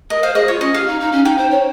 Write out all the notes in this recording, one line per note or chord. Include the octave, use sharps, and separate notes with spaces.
A#4 D#5
C5 F5
G#4 D#5
F4 C#5
C#4 D#5
G4 F5
D#4
D#4
C#4
D#4 G5
C5
C#5